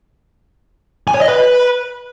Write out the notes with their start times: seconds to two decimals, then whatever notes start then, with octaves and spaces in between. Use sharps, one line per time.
1.08 G#5
1.14 C#5
1.21 D#5
1.28 B4